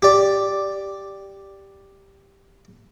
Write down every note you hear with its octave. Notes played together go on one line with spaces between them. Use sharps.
G4 D5